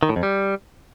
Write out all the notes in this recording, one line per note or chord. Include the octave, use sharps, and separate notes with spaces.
D#3
A2
F2
G3